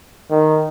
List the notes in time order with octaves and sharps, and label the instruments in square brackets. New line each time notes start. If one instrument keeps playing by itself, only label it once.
[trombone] D#3